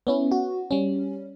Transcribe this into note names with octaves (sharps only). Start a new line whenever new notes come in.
B3 C#4 E4
F#4
G3 C#4